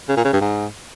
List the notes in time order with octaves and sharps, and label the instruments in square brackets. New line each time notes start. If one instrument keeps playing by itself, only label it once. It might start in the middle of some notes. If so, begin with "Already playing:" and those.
[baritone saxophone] C#3
A#2
C#3
G2
G#2